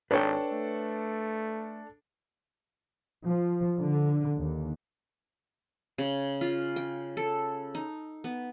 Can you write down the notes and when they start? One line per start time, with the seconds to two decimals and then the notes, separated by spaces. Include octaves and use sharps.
0.11 G#1 D4 A4 B4 C#5 G5
0.52 A3
3.27 F3
3.79 D3
4.39 D#2
5.98 C#3
6.41 F4
6.76 G5
7.17 A4
7.75 D#4
8.24 B3